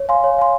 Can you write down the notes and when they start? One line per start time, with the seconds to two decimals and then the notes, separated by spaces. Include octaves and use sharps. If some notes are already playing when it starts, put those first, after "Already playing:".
Already playing: C#5
0.09 F5 G#5 C6
0.24 C#5
0.39 F5 G#5 C6